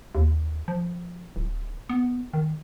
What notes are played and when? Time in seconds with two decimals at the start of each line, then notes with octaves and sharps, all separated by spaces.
0.15 D#2
0.68 F3
1.36 D1
1.89 B3
2.34 D#3